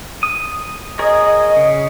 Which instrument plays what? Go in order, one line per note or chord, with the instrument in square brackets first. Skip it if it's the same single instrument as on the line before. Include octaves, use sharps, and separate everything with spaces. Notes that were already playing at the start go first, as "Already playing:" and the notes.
[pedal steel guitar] D#6
[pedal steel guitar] G#4 A#4 C#5 [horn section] D#5
[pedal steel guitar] C#3